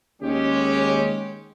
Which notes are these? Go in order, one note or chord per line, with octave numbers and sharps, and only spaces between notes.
D#2 G#3 C#4 G4